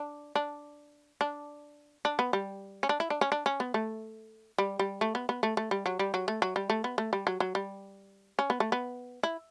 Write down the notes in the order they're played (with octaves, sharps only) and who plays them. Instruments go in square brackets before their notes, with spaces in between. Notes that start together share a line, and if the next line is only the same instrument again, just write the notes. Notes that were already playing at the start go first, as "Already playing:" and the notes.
Already playing: [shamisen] D4
D4
D4
D4
B3
G3
C#4
D4
E4
D4
C#4
D4
C#4
B3
A3
G3
G3
A3
B3
B3
A3
A3
G3
F#3
G3
F#3
A3
F#3
G3
A3
B3
A3
G3
F#3
F#3
G3
C#4
B3
A3
B3
E4